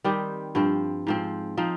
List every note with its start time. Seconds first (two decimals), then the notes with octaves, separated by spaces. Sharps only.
0.04 D#3 G3 C4 G4
0.55 G2 F3 C4
1.07 G#2 F3 C4
1.57 F3 C4 D#4